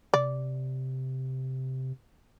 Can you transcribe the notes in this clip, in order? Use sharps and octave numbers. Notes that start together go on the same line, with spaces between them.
C3 D5